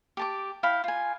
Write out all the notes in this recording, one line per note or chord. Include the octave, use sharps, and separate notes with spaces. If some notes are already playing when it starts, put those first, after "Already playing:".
G4 A5 D6
E4 F5 G5 B5
F4 G#5